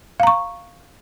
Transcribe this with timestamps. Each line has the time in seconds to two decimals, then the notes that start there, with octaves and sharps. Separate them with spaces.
0.20 F5
0.23 A#5
0.27 C#6